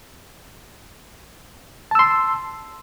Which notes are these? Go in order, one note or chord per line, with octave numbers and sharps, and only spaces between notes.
A5 C6 E6